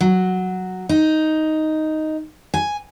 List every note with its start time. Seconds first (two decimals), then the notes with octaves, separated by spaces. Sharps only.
0.01 F#3
0.89 D#4
2.54 G#5